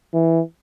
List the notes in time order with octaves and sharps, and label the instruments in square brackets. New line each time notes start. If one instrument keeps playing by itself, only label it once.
[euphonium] E3